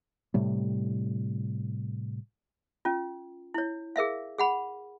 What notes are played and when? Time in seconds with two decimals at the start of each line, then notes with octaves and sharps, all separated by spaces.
0.34 A2 C3 G3
2.85 C#4 F4
3.54 E4 C#5
3.96 G#4 A#4 E5 F5
4.38 G#4 F#5 B5